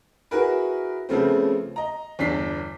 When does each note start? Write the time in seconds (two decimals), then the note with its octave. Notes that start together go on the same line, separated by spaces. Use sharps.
0.31 E4 F#4 G#4 A#4 B4
1.09 C#3 F3 A3 B3 C4
1.76 D#5 A#5
2.19 G1 E2 D4 B6 C7